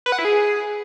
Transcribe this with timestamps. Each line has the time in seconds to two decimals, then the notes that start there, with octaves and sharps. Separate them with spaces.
0.06 B4
0.12 F#5
0.18 E4
0.25 G#4